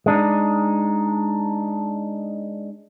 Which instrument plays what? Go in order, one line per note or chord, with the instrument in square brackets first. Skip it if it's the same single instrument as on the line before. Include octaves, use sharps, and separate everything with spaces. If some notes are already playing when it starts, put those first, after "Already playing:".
[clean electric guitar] G#3 D4 D#4